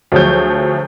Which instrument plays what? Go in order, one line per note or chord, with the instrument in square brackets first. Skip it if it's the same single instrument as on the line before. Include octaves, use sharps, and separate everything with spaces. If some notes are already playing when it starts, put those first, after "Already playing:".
[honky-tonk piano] D2 F3 F#3 G#4 C#5 G6